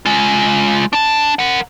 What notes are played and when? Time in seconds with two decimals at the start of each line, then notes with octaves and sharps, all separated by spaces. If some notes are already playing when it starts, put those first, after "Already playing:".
0.06 G#3 F4
0.93 D4 A5
1.39 A#4 F#5